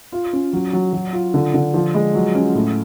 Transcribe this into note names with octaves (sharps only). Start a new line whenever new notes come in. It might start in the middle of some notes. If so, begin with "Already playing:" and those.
F4
C#4
F#3
F#3
F#3
F4
D3
D3
F3
G#3
F#3
C#4
A2